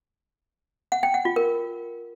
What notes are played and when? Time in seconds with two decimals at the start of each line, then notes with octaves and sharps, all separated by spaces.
0.92 F#5
1.03 G5
1.14 F#5
1.25 F4
1.36 A#4